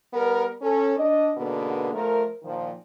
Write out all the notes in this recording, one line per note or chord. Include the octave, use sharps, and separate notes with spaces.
G3 B3 A#4
C#4 A4
D4 D#5
G#2 B2 D3 A#3 B3
F3 A3 A#4
A#2 D#3 F3